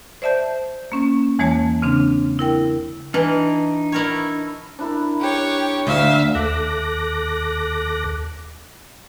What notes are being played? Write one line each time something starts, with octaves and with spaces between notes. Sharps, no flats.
C5 D5 E5 A5 G6
A#3 C#4
E2 E3 G#3 A#3 C#5 A5
C#3 C4 D4
E4 A#4 G5
E3 D4 D#4 F6
E4 A#4 C#5
D4 E4 A#4
G4 C#5
D2 E5 F5
D#2 A4 D6 F#6 A#6